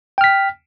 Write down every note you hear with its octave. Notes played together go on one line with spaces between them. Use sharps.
G5 F6 B6